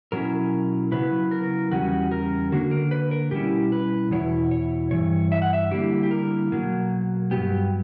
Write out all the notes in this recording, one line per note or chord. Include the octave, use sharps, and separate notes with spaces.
B2 F#3 C#4 E4 A#4
C#3 F#3 B3 E4 B4
A#4
E2 C#3 G3 C#4 F#4
A#4
D3 A#3 D4 F#4
A#4
B4
A#4
B2 G3 C#4 E4 G4
B4
E2 B2 E4 C#5
C#5
G2 E3 C#5
E5
F#5
E5
D3 G3 A#3 E4 G4
G4
A#4
B2 F#3 A#3
G2 F#3 B3 G4